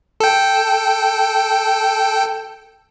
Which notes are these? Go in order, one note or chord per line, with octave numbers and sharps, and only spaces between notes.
A4 G5